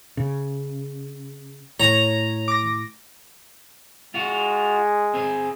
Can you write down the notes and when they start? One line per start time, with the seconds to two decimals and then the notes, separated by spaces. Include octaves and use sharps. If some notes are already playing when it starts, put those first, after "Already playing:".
0.17 C#3
1.80 A2 C#5 A#5
2.48 D6 A#6
4.14 G#3 F4 F#4
5.14 C4 G#4